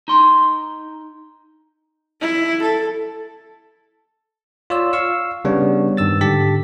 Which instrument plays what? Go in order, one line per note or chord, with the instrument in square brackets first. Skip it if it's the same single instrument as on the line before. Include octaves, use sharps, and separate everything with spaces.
[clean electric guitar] D#4 C6
[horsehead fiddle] E4
A4
[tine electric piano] F4 C#5 D5 E6
F5 C#6 E6
C#3 G3 B3 D4 C#5
G2 D#3 E6 A6
G#2 D3 G4 A5 A6 B6